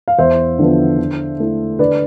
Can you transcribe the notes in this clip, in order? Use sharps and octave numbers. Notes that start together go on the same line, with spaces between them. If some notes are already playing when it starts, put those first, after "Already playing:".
F5
E2 C5 E5
D3 F3 B3
D3
A3 E4
D3 B4 D5